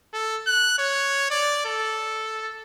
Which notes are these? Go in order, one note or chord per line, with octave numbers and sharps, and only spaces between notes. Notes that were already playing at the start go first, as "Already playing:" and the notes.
A4
F#6
C#5
D5
A4